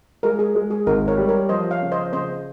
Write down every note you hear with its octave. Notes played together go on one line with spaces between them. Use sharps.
G#3 A#4
G#4
G#3
G#4
G#1 A#4
A#4 C#5
G3
A#4 C#5
F3 C5 D#5
C#5 F5
C#3
C5 D#5
C#3 C5 D#5